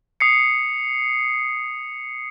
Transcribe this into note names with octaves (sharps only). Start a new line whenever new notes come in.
D#6 C7 C#7